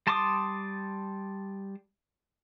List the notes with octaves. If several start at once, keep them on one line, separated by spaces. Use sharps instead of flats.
G3 A5 C6 D6 D#6